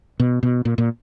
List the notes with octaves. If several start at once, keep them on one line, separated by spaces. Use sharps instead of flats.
B2
B2
A#2
A#2